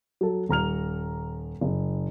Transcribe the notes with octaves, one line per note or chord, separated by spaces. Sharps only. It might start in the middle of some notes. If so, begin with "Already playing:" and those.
F#3 A4
D#1 A#5 F6 F7
F#1